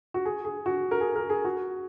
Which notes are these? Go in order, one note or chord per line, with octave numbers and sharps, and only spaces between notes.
F#4
G#4
G#4
F#4
A#4
G#4
A#4
G#4
F#4